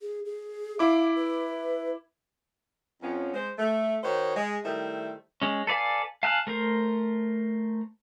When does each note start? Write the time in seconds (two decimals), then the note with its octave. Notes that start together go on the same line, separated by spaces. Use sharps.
0.01 G#4
0.25 G#4
0.79 E4 F5 D6
1.16 B4
3.02 F2 F3 B3 C#4
3.34 G#3 C5
3.58 A3
4.03 D#3 F#4 C5 C#5 D#5
4.36 G#3
4.64 D#3 G3 A3 E4 C5
5.42 G#3 C#4
5.67 A4 B4 D5 F5 G#5
6.23 F5 G#5 A5 F6 F#6
6.47 A3 A#4 C5